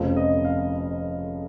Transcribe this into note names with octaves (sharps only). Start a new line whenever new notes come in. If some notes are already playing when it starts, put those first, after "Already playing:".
Already playing: F1 F2 C#3 F3
D#5
F5